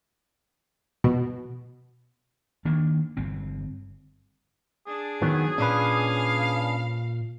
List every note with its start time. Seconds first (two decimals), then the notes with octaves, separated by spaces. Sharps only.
1.04 B2
2.65 D#3 A#3 D4
3.17 G1 C4
4.87 D4 G#4
5.22 D#3 F#3 B3
5.58 A#2 C#4 D4 B4 F5